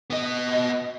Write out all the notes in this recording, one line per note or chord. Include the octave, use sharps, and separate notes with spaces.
B3 D#5